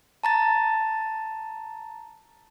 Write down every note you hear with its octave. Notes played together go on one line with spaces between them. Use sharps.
A5 A#5 A6